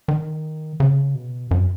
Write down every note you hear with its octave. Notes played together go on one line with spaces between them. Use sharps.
D#3
C#3
B2
F#2